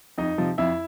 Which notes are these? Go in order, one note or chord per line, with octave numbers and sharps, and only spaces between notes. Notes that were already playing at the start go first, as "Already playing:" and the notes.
F2 D#4 D#5
C3 F3
F2 E4 E5